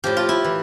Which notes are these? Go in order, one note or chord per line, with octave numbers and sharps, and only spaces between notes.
A2 F3 G4
F4
E4
E3